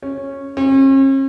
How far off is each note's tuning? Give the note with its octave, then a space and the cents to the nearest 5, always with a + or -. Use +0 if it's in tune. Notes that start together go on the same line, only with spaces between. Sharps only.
C#4 -10
C#4 -45